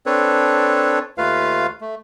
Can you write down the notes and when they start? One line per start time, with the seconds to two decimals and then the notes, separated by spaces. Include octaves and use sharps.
0.06 C4 D4 A4 B4 C#5
1.18 D#2 A3 F4 B4 F5
1.81 A3